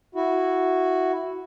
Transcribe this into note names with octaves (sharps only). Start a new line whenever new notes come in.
E4 F#4